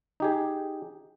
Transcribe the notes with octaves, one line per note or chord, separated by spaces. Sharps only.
D#4 G4 G#4